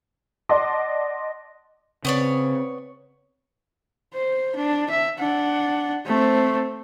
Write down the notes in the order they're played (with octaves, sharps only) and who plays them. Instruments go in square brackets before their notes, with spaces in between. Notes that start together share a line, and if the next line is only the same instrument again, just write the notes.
[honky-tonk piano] D5 D#5 F#5 A5 C6 D6
[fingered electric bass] C#3 [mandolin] B3 C#5 D5 [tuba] C4
[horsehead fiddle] C5
D4
E5
D4 F#5
A3 C4